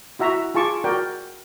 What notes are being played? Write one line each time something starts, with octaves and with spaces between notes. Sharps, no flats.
E4 F#4 E5 A#5
F4 G#4 A5 C#6 D6
F#4 A#4 D5 G5